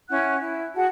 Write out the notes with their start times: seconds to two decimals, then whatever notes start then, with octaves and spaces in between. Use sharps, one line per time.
0.09 C#4 E4 F#5 F#6
0.40 E4
0.75 F#4 G#4 F#5 A5